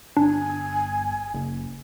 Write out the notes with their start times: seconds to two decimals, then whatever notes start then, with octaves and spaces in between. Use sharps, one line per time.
0.17 G1 D4 G#5
1.34 F#1